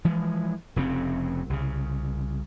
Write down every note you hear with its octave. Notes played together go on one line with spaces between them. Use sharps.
E3 F3 G#3
F1 F2 C#3 C4
C2 C#3